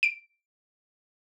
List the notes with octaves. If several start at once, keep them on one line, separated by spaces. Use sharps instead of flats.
D7